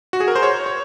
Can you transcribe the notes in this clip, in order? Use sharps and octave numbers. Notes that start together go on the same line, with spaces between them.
F#4
G#4
A#4
C5
C#5
C#5